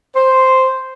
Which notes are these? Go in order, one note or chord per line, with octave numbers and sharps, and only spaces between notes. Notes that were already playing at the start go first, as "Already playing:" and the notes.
C5